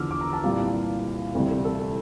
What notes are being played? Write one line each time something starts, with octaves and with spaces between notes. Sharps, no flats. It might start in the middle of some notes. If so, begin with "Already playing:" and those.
Already playing: E2 D3 F3 D6 E6 F6
D6
A#5
A5
C2 A#2 G3 F5
D2 C3 E3 G3
A4
A4
A4